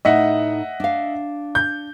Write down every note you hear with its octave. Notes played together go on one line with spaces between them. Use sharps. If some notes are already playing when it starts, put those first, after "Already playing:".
A2 D#4 D#5 E5 F#5
D4 F5
G6